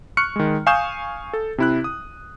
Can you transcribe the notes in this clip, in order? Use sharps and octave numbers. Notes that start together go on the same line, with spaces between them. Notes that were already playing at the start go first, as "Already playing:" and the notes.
C#6 F6 F#6 C#7
D#3 G#3
F5 G#5 C#6 D#6 G6 E7
A4
C3 E4 F#6
D#6